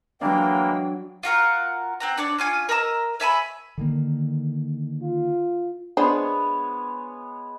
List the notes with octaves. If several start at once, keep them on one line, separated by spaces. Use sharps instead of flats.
E3 F#3 G#3 A#3 D4 G5
F4 F#4 A#4 F#5
C4 F#5 A#5
D4 C#5 D5
C#4 F4 G#5
A#4 D#5 A#5 E6
C#5 E5 G#5 B5
D3 D#3 A#3
F4
G#3 B3 D4 C5 C#5